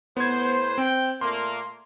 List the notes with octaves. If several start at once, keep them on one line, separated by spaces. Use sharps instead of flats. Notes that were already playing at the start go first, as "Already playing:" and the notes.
A2 B3 B4 C5 G#6
C4 G5
A#2 A3 A#3 C6